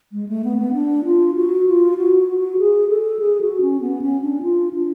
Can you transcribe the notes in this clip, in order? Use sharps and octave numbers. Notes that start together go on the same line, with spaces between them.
G#3
A3
B3
B3
D4
F4
F#4
F4
F#4
F#4
F#4
G#4
A4
G#4
F#4
C#4
B3
C#4
D4
F4
D4